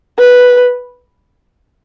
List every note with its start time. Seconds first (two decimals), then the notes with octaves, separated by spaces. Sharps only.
0.18 B4